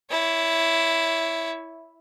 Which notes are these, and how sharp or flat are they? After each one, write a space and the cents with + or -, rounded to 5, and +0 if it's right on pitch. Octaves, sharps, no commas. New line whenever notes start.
E4 +0 C#5 +20